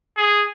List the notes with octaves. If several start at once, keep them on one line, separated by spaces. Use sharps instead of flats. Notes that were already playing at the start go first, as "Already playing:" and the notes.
G#4